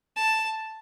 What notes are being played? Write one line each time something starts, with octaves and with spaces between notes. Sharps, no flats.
A5